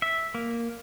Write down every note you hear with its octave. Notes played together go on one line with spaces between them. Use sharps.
E5
A#3